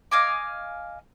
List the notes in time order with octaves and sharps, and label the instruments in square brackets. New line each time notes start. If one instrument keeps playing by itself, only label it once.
[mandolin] D#5 F5 G#5 D6